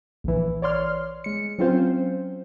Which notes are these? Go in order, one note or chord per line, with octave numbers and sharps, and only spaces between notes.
A#1 E3
C#5 D5 C6 F6
G#3 C#7
F#3 C4 C#4 F4 C5